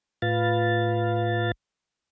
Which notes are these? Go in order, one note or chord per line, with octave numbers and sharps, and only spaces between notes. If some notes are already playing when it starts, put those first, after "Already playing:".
A2 F4 B4 F5 A6